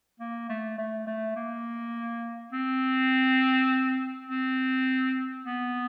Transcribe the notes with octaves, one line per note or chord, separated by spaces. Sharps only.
A#3
A3
A3
A3
A#3
C4
C4
B3